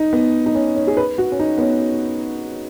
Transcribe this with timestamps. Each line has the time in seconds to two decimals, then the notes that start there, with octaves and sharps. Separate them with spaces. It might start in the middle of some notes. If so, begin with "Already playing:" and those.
Already playing: D#4
0.13 B3
0.46 D#4
0.55 C#4
0.76 C#4
0.87 G#4
0.97 B4
1.18 F#4
1.32 C#4
1.40 D#4
1.58 B3
1.61 C#4